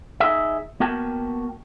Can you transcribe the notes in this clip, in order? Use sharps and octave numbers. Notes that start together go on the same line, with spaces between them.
D#4 G#4 E5
A#3 B3 F#4 A#4 G5 A5